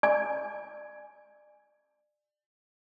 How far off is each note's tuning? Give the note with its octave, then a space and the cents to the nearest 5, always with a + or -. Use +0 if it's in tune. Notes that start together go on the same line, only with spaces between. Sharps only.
D5 +30 G#5 +0